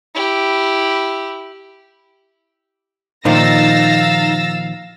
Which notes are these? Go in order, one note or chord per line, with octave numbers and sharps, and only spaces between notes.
E4 G4
A#2 D#3 F3 D#4 F5 E6 A6 A#6